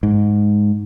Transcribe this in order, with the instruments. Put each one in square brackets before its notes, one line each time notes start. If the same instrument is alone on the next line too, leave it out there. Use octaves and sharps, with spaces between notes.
[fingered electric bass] G#2